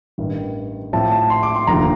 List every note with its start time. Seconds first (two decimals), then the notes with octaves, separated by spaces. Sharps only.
0.18 A1 G2 D#3
0.93 A2 F3 C4 A5
1.12 A5
1.30 C6
1.43 D6
1.55 C6
1.67 F1 D#2 D3 F3 A#5